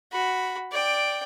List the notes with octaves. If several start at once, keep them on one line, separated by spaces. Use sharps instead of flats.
F#4 B5
D5 G5